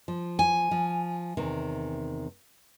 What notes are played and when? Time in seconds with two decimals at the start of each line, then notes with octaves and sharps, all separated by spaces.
0.08 F3
0.39 G#5
0.71 F3
1.37 E2 C3 D#3